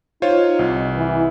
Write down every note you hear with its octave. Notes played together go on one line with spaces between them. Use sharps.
D#4 F4 C5 C#5
C2
E3